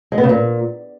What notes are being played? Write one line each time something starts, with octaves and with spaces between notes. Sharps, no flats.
G#3
B3
C#3
A#2